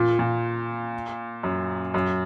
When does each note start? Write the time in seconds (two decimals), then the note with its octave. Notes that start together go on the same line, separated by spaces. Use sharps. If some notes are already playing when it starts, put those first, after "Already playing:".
Already playing: A#2
0.19 A#2
1.43 F#2
1.94 F#2